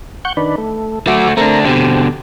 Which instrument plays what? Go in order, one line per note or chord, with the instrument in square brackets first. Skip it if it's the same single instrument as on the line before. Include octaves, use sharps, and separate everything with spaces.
[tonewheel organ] F#5 C#6 G6
D#3 D4 B4
A3
[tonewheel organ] F#3 E5 D6 [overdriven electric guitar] A3 F#4
[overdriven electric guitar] A3 D4 [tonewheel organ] C4 A#4 A#5
[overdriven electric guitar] B2 D3 [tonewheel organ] C4 G4